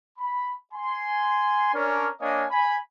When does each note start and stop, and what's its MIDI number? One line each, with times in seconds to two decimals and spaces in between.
0.18 0.53 83
0.73 1.69 80
0.73 1.69 84
1.74 2.08 61
1.74 2.08 62
1.74 2.08 70
2.20 2.45 58
2.20 2.45 62
2.20 2.45 73
2.20 2.45 75
2.20 2.45 77
2.20 2.45 80
2.51 2.76 80
2.51 2.76 83